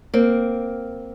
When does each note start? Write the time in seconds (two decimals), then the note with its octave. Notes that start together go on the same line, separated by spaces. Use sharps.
0.14 A#3 C4